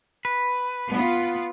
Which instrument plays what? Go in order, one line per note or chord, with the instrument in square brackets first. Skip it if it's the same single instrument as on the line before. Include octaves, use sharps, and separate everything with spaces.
[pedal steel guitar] B4
[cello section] B3 F4